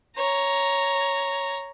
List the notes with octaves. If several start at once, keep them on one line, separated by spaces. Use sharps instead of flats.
C#5 A#5